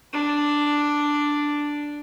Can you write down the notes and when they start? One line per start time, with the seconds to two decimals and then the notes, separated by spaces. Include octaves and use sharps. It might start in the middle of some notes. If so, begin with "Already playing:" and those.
0.13 D4